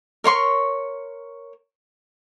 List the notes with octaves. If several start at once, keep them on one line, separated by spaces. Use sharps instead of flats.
A#4 C#5 C6 C#6